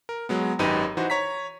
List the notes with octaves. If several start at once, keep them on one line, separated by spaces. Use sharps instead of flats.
A#4
F#3 G#3 B3
G#1 F#2 D#4 G4 B4 D#7
E3 D#4 F#4 C5
C#5 A#5 B6